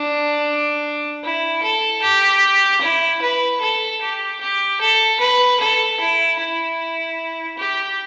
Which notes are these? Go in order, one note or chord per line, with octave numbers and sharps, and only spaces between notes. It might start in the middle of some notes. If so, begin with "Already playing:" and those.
Already playing: D4
E4
A4
G4
E4
B4
A4
G4
G4
A4
B4
A4
E4
E4
G4